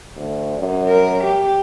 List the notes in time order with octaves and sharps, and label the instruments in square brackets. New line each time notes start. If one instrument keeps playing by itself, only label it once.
[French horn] D2
F#2
[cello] A#4
G4